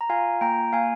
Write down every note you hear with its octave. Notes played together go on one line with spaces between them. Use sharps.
A#5
F4 F5 G#5
A#3 G5 A#5
A#3 F5 G#5